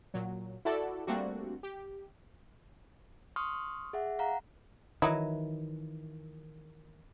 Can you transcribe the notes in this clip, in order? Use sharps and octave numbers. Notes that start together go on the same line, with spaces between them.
A#2 F#3
E4 F#4 A4 D5
G3 A3 A#3 C4 D4 F#4
G4
C6 C#6 D#6 F6
G#4 E5 F#5
F5 F#5 A#5
D#3 E3 F#3 D#4 E4